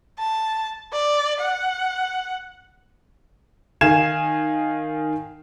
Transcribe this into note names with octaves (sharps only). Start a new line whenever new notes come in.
A5
D5
F#5
D#3 F5 G#5 G#6 E7